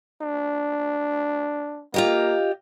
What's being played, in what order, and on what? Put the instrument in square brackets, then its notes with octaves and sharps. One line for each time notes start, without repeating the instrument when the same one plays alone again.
[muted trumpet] D4
[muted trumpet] A#3 [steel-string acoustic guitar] F4 G4 D#5